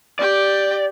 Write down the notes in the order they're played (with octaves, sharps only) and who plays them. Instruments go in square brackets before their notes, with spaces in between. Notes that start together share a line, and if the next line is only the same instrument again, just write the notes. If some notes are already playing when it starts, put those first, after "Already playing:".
[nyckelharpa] G4 G5 [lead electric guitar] D5